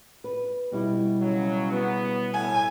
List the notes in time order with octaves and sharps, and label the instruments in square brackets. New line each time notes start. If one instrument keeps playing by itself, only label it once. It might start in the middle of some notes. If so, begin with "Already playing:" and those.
[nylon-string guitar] B4
B2 G3 E4
[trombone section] C#3 F#3
B3
[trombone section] A2 [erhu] G#5